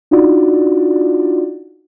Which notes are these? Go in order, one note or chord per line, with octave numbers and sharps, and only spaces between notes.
D4 D#4 F4 F#4 D5